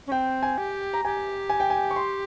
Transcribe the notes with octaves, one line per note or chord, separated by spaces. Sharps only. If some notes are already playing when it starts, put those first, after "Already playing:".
C#4
C4 G5
G#5
G4
A#5
G4 G#5
G#5
G5
G#5
C#6
C6